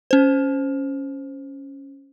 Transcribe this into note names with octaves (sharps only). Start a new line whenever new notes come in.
C#4 C5